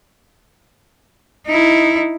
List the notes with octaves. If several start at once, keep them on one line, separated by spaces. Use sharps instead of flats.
D#4 E4